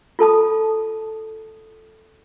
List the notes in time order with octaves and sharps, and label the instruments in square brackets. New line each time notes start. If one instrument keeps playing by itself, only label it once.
[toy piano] F4 A4 A5 D#6